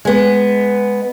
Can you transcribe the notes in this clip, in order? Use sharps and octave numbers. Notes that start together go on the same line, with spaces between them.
G#3 B3